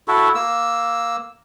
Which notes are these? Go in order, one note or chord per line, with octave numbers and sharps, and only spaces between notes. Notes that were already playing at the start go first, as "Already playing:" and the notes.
E4 F#4 A4
A#3 E6